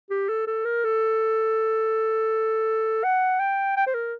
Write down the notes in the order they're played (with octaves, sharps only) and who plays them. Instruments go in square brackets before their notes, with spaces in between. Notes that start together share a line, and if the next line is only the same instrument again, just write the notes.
[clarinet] G4
A4
A4
A#4
A4
F#5
G5
G5
C5
A#4